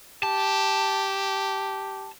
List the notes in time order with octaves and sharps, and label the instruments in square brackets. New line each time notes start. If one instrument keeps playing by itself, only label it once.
[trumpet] G4 [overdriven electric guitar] A5